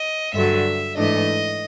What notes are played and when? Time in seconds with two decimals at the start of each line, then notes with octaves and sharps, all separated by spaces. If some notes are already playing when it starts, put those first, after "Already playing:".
Already playing: D#5
0.33 G2 D3 F#3 E5
0.96 G#2 E3 A3 D4 D#5